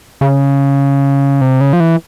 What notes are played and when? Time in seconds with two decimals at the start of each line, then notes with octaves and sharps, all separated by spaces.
0.21 C#3
1.41 C3
1.61 C#3
1.73 F3
1.80 E3